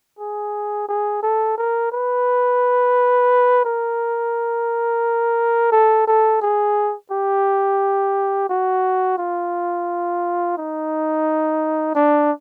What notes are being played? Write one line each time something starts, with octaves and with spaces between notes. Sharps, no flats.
G#4
G#4
A4
A#4
B4
A#4
A4
A4
G#4
G4
F#4
F4
D#4
D4